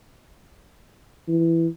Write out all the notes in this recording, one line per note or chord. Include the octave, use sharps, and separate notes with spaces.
E3